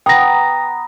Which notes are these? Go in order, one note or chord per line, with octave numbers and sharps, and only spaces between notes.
B3 G5 A#5 D#6 A#6